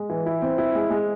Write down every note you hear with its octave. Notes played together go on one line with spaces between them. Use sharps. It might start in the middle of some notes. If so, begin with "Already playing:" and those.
Already playing: G#3
E3
E4
C4
E4
G#3
G#3